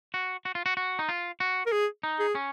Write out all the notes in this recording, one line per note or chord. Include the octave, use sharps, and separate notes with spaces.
F#4
F#4
F4
F#4
F#4
D#4
F4
F#4
A#4
G#4
D#4
G#4
C#4